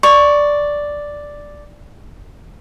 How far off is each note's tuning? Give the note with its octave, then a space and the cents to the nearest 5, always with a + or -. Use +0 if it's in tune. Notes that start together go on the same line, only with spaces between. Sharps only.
D5 +0 C#6 +0